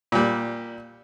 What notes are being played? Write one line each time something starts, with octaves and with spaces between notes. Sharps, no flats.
A#2 G3